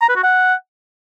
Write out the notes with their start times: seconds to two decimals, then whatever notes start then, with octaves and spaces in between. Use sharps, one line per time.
0.01 A#5
0.09 B4
0.16 F#4
0.23 F#5